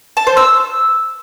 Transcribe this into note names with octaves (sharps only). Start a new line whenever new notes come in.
A5
C5
E6